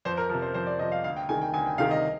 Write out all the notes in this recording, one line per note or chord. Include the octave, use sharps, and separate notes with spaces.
F2 C5
A#4
C3 F3 A#4
C5
F2 C5
D5
C3 F3 D#5
F5
D2 F5
G5
C3 D#3 G#5
G5
D2 G#5
G5
C3 D#3 F5
D#5